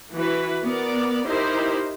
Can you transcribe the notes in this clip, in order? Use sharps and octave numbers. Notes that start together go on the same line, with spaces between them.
E3 F#4 B4
B3 A#4 D5
D#4 E4 G4 A#4 C5